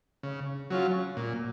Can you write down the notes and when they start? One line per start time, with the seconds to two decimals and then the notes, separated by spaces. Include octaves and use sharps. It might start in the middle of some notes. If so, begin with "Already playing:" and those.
0.23 C#3
0.70 F#3 C#4 F4
1.17 A#2